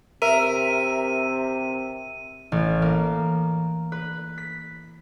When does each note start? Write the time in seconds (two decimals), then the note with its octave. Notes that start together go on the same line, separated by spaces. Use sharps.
0.22 C3 A#4 E5 D#7
2.52 A1
2.82 A#3
3.92 B4
4.38 B6